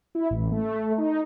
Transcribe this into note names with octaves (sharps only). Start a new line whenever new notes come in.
E4
A1
A3
D#4